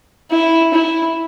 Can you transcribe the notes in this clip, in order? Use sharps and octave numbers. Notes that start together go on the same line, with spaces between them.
E4
E4